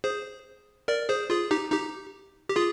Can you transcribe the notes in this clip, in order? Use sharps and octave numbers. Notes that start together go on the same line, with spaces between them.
G#4 C5
A#4 D5
G#4 C5
F4 G#4
D#4 G4
D#4 G4
G4
F4 G#4